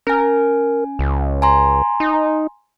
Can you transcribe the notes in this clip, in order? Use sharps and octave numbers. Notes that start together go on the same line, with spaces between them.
C#4 A#4 G#5
C#2
G#5 A#5 C6
D#4